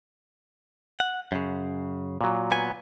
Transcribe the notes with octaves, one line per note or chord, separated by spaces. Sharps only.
F#5
F#2 C#3
A#2 F#3
B3 G#5